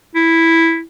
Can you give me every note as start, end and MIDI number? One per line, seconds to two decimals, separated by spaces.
0.15 0.82 64